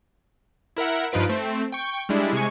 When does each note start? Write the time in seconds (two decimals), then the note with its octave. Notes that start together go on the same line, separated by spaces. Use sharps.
0.77 E4 A#4 E5 F#5
1.12 G2 F3 D#4 F4 B4 D7
1.29 A3 C4
1.72 G5 C#6
2.09 G3 G#3 D4 E4
2.33 C3 G#3 G#5 C#6